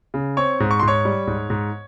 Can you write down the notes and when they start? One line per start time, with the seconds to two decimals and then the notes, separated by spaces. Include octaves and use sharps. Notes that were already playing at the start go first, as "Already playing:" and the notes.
0.14 C#3
0.37 C4 C#5 C#6
0.60 G#2
0.71 C#6
0.80 G#2 C6
0.88 C#5 C#6
1.05 G3
1.27 G#2
1.50 G#2